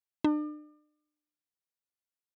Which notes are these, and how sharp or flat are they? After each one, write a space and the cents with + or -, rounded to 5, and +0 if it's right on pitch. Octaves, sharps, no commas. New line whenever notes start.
D4 +40